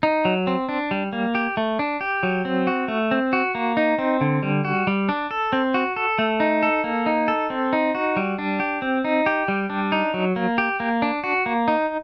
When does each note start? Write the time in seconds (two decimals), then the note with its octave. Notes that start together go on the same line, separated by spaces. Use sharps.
0.03 D#4
0.25 F#3
0.47 C4
0.69 D4
0.91 G3
1.13 A#3
1.35 G4
1.57 A3
1.79 D4
2.01 G4
2.23 F#3
2.45 C4
2.67 F#4
2.88 A3
3.11 C4
3.33 F#4
3.55 A#3
3.77 D#4
3.99 C4
4.21 D3
4.43 G3
4.65 F#4
4.87 G3
5.09 D4
5.31 A4
5.53 C4
5.74 F#4
5.96 A4
6.19 A3
6.40 D#4
6.63 A4
6.84 A#3
7.06 D#4
7.28 A4
7.50 C4
7.73 D#4
7.95 F#4
8.16 G3
8.39 D4
8.60 G4
8.82 C4
9.05 D#4
9.26 G4
9.48 G3
9.70 D4
9.92 D#4
10.14 F#3
10.36 A#3
10.58 G4
10.80 A#3
11.02 D4
11.24 F#4
11.46 A#3
11.68 D#4